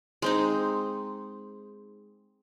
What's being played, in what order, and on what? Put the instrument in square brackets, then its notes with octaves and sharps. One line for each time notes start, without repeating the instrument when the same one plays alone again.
[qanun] G#3 C4 D#4